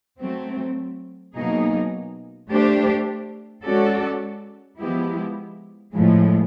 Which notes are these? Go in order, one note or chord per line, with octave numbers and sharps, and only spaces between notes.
F#3 A3 C4
B2 F#3 A#3 D#4 G#4
A3 D4 G4 C5
G#3 C#4 F#4 A4 D5
F3 G#3 B3 E4 G4
A2 F3 G#3